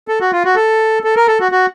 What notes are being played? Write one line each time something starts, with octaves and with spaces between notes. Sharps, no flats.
A4
F#4
F4
F#4
A4
A4
A#4
A4
F#4
F#4